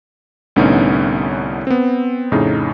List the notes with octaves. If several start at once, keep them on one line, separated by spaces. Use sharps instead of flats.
C2 A2 D3 B3 C#4 D#4
B3 C4
F2 A2 C#3 D#4